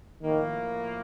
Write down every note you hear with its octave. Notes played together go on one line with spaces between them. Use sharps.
A2 D#3 F3 A#3